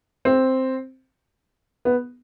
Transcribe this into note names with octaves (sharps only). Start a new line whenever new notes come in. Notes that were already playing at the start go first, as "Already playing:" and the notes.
C4
B3